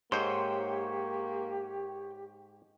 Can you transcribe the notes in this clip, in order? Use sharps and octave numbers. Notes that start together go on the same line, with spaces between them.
G#2 A#3 G4 C5 C#5 C6